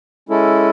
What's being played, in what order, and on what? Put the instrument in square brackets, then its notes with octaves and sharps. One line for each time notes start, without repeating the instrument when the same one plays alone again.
[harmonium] G#3 C#4 E4 A4